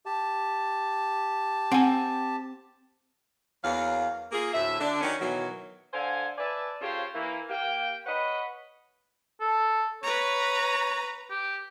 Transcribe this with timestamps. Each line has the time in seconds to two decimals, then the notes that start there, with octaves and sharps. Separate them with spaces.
0.06 G4 A5
1.72 C4 F#5 G#5
3.64 E2 F#3 A#3 F5
4.32 A#3 F4 G#4
4.53 D2 A2 E5
4.80 D3 D4
5.01 D#3 F#3 C#4
5.20 B2 D#3 E3 F#3
5.93 D3 C5 F5 G#5
6.38 B4 D5 E5 G#5 A5
6.81 C#3 F4 G4 A4 C5 C#5
7.14 E3 A#3
7.50 A#3 G4 G5
8.06 B4 C#5 D#5 F#5 B5
9.41 A4
10.03 B4 C#5 A#5
11.31 G4